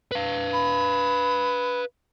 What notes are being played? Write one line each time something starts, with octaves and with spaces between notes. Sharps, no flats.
B4 F5
B5